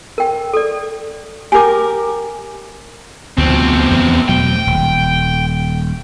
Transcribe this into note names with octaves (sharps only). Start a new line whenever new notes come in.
A#4 G5
A4 D5
G4 A#4 G#5 D6
D2 B2 F3 C4
E2
B2 F#3 A3 G5
D#1